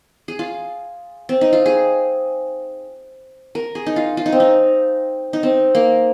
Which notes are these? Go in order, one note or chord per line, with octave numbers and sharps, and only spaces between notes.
G#4
F4
C4
D#4
F4
G#4
A#4
G#4
D#4
F4
F4
D#4
C4
D#4
D#4
C4
A#3